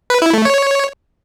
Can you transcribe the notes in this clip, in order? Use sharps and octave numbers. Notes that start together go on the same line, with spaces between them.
B4
E4
A3
C#5